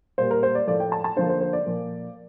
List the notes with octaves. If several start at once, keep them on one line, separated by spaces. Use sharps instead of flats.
A#2 G3 A#3 C5
A#4
C5
D5
A2 F3 A3 D5
G5
A5
A5
D3 F3 A#3 C5
C5
C5
D5
A#2 F3 A#3